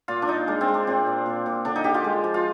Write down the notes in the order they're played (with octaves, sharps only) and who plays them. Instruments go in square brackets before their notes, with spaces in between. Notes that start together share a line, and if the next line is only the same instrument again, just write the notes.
[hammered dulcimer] A#2 F4
D4
A#2 D#4
G#3 D4
C4
G#3
D4
A#2 C4
A#2
A#2
A#2
D3 D4
D#4
D3 G4
F4
G#3
F3
F4